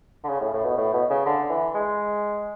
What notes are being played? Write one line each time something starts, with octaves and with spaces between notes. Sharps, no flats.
D3
C#3
A2
A2
B2
A2
B2
C#3
D3
E3
G#3